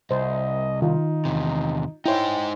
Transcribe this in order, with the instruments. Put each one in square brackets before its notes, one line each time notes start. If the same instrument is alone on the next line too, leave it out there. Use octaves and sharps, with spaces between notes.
[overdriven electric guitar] C2 [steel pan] C5 [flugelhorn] D#5
[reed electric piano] D#3 [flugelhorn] D#4 [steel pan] F4
[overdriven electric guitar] E2 C3
[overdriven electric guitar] D#4 C5 [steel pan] E4 C#5 [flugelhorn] G5